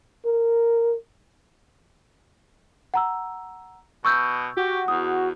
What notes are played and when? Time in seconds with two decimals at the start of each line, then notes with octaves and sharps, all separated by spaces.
0.25 A#4
2.94 F#5 A#5 E6
4.05 B2 C#6 E6 G6
4.57 F#4 G4
4.88 E2 D#6